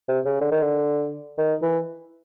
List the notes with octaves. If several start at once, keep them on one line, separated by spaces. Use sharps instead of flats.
C3
C#3
D3
D#3
D3
D#3
E3